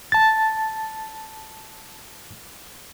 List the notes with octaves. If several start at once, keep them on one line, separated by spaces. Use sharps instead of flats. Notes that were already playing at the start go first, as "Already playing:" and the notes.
A5 A6